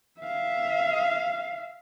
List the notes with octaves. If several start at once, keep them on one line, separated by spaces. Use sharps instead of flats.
E5 F5